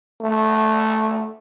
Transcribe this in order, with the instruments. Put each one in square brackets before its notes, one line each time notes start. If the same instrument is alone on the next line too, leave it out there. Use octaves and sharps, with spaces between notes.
[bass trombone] A3